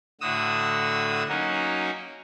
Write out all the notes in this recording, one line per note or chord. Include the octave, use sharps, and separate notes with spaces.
A2 D3 F#4 D#6 E6
F#3 A#3 C#4 D#4 F#4